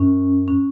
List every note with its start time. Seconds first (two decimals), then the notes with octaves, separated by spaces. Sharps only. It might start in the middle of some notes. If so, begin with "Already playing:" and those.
Already playing: F#2 C#4
0.48 C#4